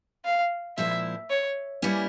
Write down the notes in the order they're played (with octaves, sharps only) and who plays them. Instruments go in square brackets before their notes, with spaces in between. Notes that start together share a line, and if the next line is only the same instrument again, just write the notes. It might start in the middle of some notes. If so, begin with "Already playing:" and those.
[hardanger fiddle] F5
[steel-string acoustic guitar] A#2 F3 G#3 C4 E4 [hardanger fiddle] E5
[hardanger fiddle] C#5
[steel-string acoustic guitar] E3 G3 A#3 C#4 E4